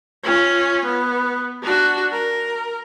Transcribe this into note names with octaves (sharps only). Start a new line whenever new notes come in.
C#4 F4
B3
D4 F#4
A#4